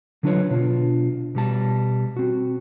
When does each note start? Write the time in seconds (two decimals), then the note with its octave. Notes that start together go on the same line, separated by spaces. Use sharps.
0.23 D3 F#3 D4 F4 B4 C#5
0.50 B2 D4 F4
1.35 B2 G3 A5
2.17 C4 F#4